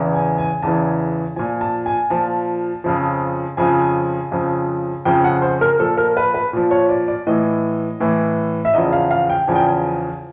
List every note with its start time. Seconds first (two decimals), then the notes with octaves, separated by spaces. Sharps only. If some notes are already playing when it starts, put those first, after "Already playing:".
Already playing: E2 C#3 E3
0.14 G#5
0.38 G#5
0.62 E2 C#3 E3 A5
1.36 A#2 F3 G#5
1.61 A5
1.86 G#5
2.10 A#2 F3 A5
2.84 F2 C#3 F3
3.57 F2 C#3 F3 G#5
4.32 F2 C#3 F3
5.05 F2 C#3 F3 G5
5.24 F#5
5.42 C5
5.61 A#4
5.79 A#2 F3 A4
5.98 A#4
6.17 B4
6.34 B4
6.53 A#2 F3
6.71 C#5
6.89 D5
7.08 D5
7.27 A2 E3 D#5
8.00 A2 E3
8.65 E5
8.74 E2 C#3 F3 D#5
8.93 F5
9.11 F5
9.30 G5
9.47 E2 C#3 F3 G#5
9.55 G5
9.62 G#5